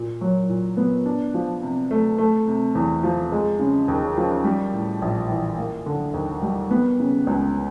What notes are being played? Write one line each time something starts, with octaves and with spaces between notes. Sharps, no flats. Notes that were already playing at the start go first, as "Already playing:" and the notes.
Already playing: A#2
F#3
A#2
B3
D4
F3
C3
A3
A3
C3
E2
F3
G#3
C#3
D#2
F3
G3
A2
A#1
E3
A#3
D3
D#2
G3
B3
C#3
C#2